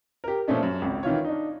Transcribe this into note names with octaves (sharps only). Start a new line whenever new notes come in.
G4 A#4
A#2 F3 A3 C#4 D4
F#2
G#1 C#2
D#3 E3 F4 C#5
D4 D#4